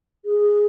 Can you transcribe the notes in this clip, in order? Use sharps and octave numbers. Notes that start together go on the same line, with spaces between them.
G#4